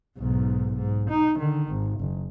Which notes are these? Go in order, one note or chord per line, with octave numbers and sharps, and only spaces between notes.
B1 G#2
G#2
D#4
D3 D#3
G#1
F#1